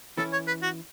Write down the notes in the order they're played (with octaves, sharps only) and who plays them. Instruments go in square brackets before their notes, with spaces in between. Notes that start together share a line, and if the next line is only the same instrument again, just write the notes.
[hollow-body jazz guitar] E3 C#4 E4 [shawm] A4
[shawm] C#5
B4
F#4